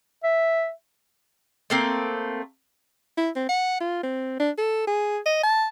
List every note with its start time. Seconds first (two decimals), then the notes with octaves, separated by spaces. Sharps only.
0.24 E5
1.70 A3 A#3 C4
3.17 E4
3.36 C4
3.49 F#5
3.80 F4
4.03 C4
4.40 D4
4.58 A4
4.87 G#4
5.26 D#5
5.43 A5